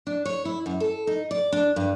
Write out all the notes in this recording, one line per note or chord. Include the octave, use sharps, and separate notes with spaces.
D4
C#5
E4
F#2
A4
D#4
D5
D4
G2